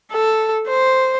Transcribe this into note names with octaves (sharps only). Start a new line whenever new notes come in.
A4
C5